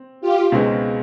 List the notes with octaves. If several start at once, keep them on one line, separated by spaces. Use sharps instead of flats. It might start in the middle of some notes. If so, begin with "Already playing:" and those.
Already playing: C4
F4 G4
C#2 B2 G#3 C4 D#4